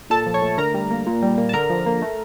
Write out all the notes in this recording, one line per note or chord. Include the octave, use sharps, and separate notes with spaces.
A#2 A4 A5
F3
C#5 C#6
A3
D3 A#4 A#5
G3
A#3
A#2
G3
A#3
A5
D3 A#4 A#5
F3
A#3
A3